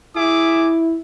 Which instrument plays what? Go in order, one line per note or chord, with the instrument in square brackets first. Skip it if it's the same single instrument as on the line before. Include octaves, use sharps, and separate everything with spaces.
[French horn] E4 [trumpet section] G#4 E5 D6